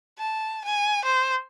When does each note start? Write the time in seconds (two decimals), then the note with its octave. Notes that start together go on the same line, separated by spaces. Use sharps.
0.18 A5
0.65 G#5
1.05 C5